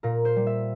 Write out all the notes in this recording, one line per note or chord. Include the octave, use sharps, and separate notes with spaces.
A#2 A#4
C5
G3
E5